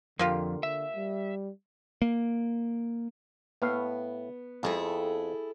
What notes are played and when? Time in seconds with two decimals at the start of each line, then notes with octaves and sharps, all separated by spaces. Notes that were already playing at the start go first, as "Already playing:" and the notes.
0.19 F2 D3 A#3 F4 G4
0.63 D3 E5
0.96 G3
2.02 A#3
3.62 A2 B3 F5
4.63 F2 E4 G#4 A4